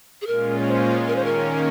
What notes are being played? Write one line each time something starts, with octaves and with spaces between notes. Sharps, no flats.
G#4
A#2 G#3 C#4 F4 A#4
C5
D#3 A#3 C#4 A#4
C5
A#4